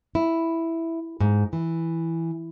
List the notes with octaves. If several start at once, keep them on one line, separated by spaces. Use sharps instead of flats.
E4
G#2
E3